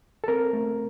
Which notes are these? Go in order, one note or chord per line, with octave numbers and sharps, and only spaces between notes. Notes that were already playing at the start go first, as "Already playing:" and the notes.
A4
C4 A#4
A3